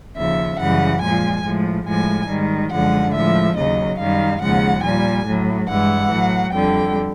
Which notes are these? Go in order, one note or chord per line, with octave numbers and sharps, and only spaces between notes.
D#2 C#3 F3 E5
F#2 C#3 E3 G3 F#5
A#2 F3 G#3 G#5
A2 F3 G#3
A2 F3 G#3 G#5
G#2 D#3 G3
F#2 D3 F3 G#3 F#5
A2 F3 G#3 E5
D#2 C#3 F#3 D#5
F#2 D#3 G3 F5
D#2 C#3 F3 G#3 F#5
A#2 G3 G#5
A2 F#3
G2 E3 G#3 F#5
A2 F#3
F2 D3 G3 G5